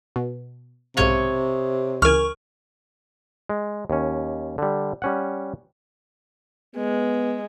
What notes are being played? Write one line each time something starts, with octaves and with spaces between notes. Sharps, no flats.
B2
B1 G#2 C3 C#5 D#5 F5
C#2 E3 A#4 G#5 C#6 F6
G#3
D#2 C#4
D3 G3
G3 C#4 F#5
G#3 B3